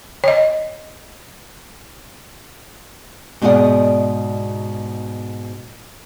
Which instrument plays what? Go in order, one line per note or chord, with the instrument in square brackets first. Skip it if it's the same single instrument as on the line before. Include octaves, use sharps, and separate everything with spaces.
[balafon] C#5 D#5
[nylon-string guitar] G#2 B2 D#4 G#4 D5 F#5